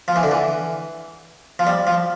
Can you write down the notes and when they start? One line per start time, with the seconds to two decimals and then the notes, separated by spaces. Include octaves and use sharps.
0.08 F3
0.16 E3
0.23 D3
0.31 E3
1.59 F3
1.67 G3
1.87 F3